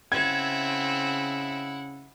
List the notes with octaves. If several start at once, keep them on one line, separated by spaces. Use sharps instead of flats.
C#3 C4 E4 E5 F#5 G#6